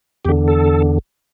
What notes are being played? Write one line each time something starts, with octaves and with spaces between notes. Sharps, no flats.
E2 D3 G4
A4